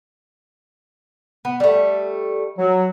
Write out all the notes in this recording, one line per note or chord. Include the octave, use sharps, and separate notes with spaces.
B3
G3 A3
F#3